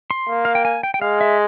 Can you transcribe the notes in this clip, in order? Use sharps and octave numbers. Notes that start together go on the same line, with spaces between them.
C6
A#3
F5
G5
G#5
G5
G5
G#3 F5
E5